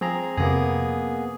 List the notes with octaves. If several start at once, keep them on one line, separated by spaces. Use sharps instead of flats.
F3 C4 G#4 A#5
F2 C3 A#3 B3 G#4